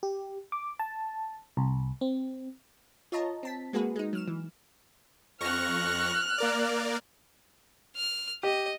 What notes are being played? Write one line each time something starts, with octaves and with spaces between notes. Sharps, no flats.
G4
D6
A5
C2
C4
F4 C#5 D#5 A5 A#5
C4 A5 B6
G#3 A#3 F#4 G#4 B4
G#3 D#4
F#3 F6 E7
E3
F2 C#6 F6 F#6 A#6
A#3 A#4 D5
F6
G4 D#5